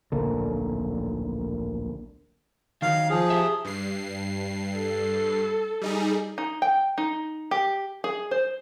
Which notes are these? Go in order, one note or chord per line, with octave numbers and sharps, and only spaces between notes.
D1 A#1 A#2 D3
D#3 F#3 F5
F3 G#4
G4 E5
G2 C7
A4
G3 D#4 G#4
D#4
G5
D#4
G4
G#4
C5